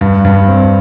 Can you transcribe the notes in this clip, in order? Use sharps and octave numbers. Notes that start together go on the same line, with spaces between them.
G2
G2
C4